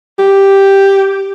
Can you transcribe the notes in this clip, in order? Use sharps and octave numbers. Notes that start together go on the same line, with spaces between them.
G4